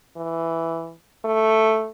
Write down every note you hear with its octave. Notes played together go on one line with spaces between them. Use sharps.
E3
A3